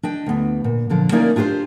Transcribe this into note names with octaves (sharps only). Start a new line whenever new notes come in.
D4 D#5 G5
D2 B3
A#2
A#2 D3 F3
A#3 C#4 D#4 E4 A#4 D5
D4 F4 G4 B4 C5